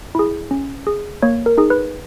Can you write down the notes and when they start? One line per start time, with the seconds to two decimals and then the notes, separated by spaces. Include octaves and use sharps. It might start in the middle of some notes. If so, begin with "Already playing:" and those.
0.15 E4 G#4
0.51 C#4
0.87 G#4
1.22 A#3 C#5
1.46 A#4
1.58 D#4 G#4
1.70 B4